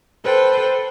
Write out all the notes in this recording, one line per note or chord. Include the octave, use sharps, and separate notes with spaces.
A4 B4 C5 G5